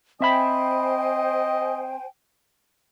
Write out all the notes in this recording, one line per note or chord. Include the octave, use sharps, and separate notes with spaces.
C4 C5 D#5 E5 G5 G#5 B5